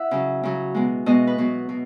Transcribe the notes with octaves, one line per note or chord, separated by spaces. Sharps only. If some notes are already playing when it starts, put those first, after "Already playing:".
Already playing: E4 E5 F#5
C#3 F#3
C#3 F#3
B2 G#3
B2 G#3 D#5
B4
B2 F#3
B2